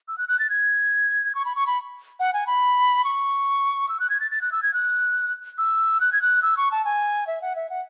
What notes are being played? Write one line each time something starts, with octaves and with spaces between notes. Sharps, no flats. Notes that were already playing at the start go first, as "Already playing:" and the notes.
E6
F#6
F#6
A6
G#6
C#6
B5
C#6
B5
F#5
G#5
B5
C#6
E6
F#6
G#6
A6
A6
F#6
E6
G#6
F#6
E6
F#6
G#6
F#6
E6
C#6
A5
G#5
E5
F#5
E5
F#5